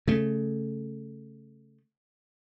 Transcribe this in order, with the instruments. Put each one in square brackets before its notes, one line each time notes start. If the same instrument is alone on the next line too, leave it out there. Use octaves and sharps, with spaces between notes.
[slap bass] C#3 A3